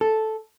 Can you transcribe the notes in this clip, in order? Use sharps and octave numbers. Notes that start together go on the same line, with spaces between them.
A4